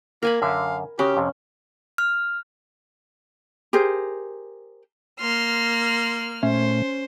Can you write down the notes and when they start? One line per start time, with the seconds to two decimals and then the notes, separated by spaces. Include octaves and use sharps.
0.22 A#3 A#4 G#5 B5
0.42 F#2 D3 E5 F5
0.99 C#3 C#4 F#4 G4 A#4
1.17 F2 C3
1.98 F6
3.73 G4 G#4 A#4 C5
5.20 A#3 C6 F6
6.43 A#2 A3 C#4 C5